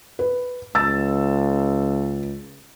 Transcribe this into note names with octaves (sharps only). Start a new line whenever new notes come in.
B4
C#2 E6 A6